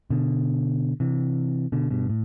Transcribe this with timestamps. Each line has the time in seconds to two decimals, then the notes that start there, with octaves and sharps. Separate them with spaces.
0.10 B2 D3
1.00 C3 E3
1.72 B2 D3
1.91 G2 B2
2.10 A2